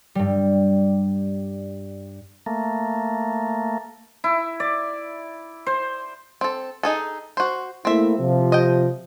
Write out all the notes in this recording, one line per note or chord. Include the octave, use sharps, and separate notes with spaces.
G2 G3
A3 A#3
E4
D5
C5
C4 A4
D#4 G#4 A4
F#4 C5
A3 A#3 C4 E4 E5
C3 F3
D#5 G5